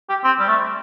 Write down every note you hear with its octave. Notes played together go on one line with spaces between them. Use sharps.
G4
C4
G3
A3